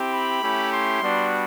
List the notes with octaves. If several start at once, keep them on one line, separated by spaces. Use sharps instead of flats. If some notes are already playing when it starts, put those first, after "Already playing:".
Already playing: C4 E4 G4
B5
A3 C#4 E4 G4
C6
G3 B3 D4 F#4